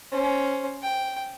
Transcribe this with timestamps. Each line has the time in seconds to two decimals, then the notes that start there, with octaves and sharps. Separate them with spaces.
0.12 C#4 C5
0.83 G5